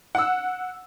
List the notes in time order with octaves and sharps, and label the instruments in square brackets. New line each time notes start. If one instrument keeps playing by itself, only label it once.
[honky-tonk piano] F#5 E6